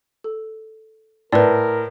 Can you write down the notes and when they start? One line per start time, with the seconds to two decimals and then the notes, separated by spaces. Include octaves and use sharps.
0.24 A4
1.32 A2 A#4 B4 D5